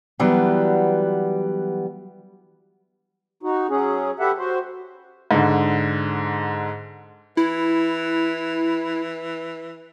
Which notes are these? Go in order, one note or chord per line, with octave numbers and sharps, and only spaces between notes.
E3 F#3 G3 B3 D4
D#4 F#4
F#3 C#4 G#4
G4 A4 B4 E5 F#5
F#4 C5
G#2 D3
E3 E4